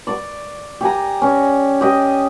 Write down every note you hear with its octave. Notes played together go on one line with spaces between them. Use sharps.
D5 C#6
G4 G#5 A#5
C#4
G4 D#5